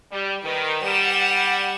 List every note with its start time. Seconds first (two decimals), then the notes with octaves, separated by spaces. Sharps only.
0.11 G3
0.43 D#3 B4
0.82 G3 F#5 E7